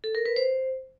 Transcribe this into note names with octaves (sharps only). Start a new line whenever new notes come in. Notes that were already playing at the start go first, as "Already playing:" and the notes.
A4
A#4
B4
C5